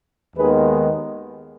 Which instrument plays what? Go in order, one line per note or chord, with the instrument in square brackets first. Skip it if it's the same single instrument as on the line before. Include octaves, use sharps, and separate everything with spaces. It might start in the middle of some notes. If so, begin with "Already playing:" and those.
[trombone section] D#2 D#3 G#3 B3 G#4 B4